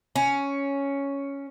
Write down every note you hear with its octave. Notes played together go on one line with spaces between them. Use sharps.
C#4